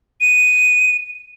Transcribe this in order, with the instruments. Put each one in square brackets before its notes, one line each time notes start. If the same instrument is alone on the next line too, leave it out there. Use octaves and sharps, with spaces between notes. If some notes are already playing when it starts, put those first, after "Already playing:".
[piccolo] D#7